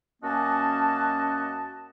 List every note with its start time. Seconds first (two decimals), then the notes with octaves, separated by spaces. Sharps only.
0.23 F#2 A#3 C#4 F#4 D#5 A5